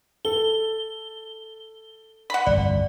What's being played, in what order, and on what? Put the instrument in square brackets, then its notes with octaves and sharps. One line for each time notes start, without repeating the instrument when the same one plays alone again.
[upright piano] A4 [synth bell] G7
[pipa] F#5 B5
[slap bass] G1 C2 F2 [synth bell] D5